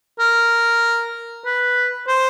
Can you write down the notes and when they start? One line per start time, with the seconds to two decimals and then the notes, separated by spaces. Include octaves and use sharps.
0.20 A#4
1.46 B4
2.08 C5